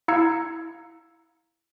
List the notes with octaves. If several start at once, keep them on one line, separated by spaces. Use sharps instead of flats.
E4 F5 A#5 E6 G#6 C#7